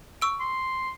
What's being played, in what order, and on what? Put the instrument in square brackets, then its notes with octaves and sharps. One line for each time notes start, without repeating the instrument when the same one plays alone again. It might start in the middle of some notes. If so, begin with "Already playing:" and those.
[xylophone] C#6 E6 D7
[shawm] C6